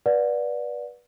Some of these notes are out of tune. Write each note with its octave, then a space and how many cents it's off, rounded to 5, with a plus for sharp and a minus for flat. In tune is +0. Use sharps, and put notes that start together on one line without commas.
B4 -20 D5 +0 F#5 -35